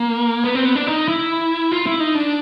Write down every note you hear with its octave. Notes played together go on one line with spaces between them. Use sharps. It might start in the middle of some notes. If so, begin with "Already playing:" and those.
Already playing: A#3
B3
C4
B3
D4
D#4
E4
F4
E4
D#4
D4